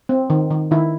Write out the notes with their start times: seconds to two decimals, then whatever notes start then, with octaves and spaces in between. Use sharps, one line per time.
0.09 C4
0.30 D#3
0.51 D#3
0.71 D#3 E4